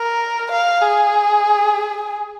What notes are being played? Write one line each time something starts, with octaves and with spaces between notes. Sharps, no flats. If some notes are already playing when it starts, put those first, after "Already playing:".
Already playing: A#4
F5
G#4